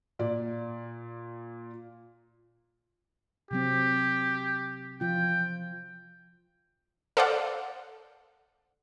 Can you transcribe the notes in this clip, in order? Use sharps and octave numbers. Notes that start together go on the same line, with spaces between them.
A#2 D5
C3 F#3 C4 G4
E3 F3 F4 G5
A4 C5 D5 F5 F#5